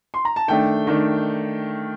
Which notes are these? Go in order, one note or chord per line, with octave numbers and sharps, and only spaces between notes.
C6
A#5
A5
D#3 A3 D4 G5
D#3 A3 D4